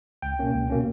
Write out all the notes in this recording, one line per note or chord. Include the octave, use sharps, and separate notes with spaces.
C#2 G5
B2 A#3 C#4
C#2
B2 A#3 C#4